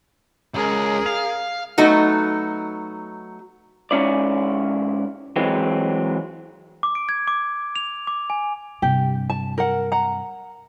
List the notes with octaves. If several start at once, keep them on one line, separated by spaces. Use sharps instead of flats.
C#2 G#4 A#4
F5
F#3 A3 B3 D#4 F#4
G#2 C#4 E4 D5
E3 F#3 G#3 C4
D6
D7
G#6
D6
F7
D6
G#5
G2 C3 G4 G5
A5
A#4 F#5
F#5 A#5